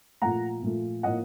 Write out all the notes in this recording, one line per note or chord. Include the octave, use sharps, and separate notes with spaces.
A#2 F3 A3 F#5 A#5
A#2 F3 A3
A2 F3 A#3 D#5 F#5